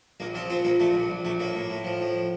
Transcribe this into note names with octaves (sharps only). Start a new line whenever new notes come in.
A#1 A#3
F3 C4
A#2 C4
A#1 A#3
A#2 A3
A#1
A#1
A#1 A3
A2 A#3
A2
A2
F3
A2